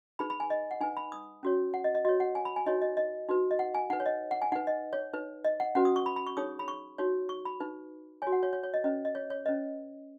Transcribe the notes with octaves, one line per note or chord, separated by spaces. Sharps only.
D#4 G#4 B4 B5
B5
G#5
D#5
F#5
D#4 B4 G#5
B5
D#6
C#4 F#4 C#5
F#5
D#5
D#5
F#4 C#5 D#5
F#5
G#5
B5
G#5
D#4 F#4 C#5 D#5
D#5
D#5
D#4 F#4 B4
D#5
F#5
G#5
D#4 B4 F#5
C#5
D#5
F#5
G#5
D#4 B4 F#5
D#5
C#5
D#4 B4
D#5
F#5
C#4 F#4 B4 F#5
D#6
C#6
B5
B5
C#6
D#4 G#4 C#5 D#6
B5
C#6
D#4 F#4 C#5
C#6
B5
D#4 B4
F#4 C#5 G#5
F#5
C#5
C#5
C#5
D#5
C#4 B4 D#5
D#5
C#5
C#5
C#4 B4 D#5